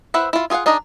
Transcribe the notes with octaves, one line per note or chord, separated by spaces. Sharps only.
E4 B4 C5 E5 F#5
E4 F4
F4 G#4 B4 F5 F#5
D4 D#4 G#4 D#5